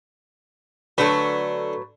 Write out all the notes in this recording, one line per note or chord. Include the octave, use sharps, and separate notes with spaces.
D3 F#3 A3 B4